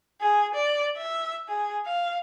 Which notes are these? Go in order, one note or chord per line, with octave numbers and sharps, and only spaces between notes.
G#4
D5
E5
G#4
F5